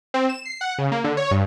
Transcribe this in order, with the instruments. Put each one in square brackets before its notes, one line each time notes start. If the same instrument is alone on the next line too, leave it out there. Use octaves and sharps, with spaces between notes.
[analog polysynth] C4
E7
C7
F#5
C#3
A#3
D3
C#5
G2